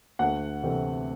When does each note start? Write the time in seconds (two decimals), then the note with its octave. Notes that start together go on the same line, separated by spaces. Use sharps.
0.19 D2 F#5
0.63 C3 E3 A3 C4